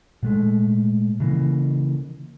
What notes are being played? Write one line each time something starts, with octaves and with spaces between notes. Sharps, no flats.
A#2 G#3 A3
C#3 E3 A#3